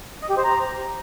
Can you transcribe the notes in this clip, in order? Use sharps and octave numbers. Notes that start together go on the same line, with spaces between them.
D#5
G4
C5
A#5